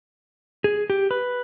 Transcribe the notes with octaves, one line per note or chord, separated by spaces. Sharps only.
G#4
G4
B4